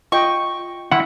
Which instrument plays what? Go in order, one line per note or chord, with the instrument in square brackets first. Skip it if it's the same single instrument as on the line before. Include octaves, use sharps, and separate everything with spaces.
[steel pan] F4 D#5 G5 [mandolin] C#6
[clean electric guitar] E4 [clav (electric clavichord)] F#5